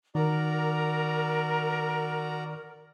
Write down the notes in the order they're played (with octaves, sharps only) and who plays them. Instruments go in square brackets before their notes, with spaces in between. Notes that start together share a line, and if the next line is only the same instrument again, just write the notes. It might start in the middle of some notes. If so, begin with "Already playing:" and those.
[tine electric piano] D#3 [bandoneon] F#4 D5 A#5 [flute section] A#4